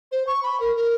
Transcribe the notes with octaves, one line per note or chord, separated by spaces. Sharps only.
C5
C#6
B5
A#4
A#4